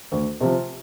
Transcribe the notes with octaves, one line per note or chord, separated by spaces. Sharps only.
D2
C3 F3